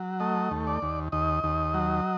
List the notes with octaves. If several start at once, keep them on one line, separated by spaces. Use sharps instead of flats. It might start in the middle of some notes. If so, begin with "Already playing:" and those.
Already playing: F#3
A3 D#5
D#2
D5
D#2
D#2 D#5
D#2
F#3